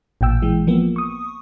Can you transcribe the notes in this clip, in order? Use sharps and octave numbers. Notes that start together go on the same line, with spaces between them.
A1 A#2 G5 E6
E3 G#3
F3 A#3 B3
C#6 D#6